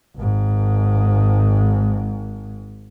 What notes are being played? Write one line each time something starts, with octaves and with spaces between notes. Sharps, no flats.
G#1 G#2